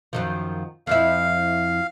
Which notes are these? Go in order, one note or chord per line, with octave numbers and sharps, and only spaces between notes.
F#2 D#3 F3
F2 F3 E4 F5